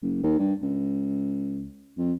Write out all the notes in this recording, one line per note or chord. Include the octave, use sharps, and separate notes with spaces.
F#1
D#2
G2
C#2
F2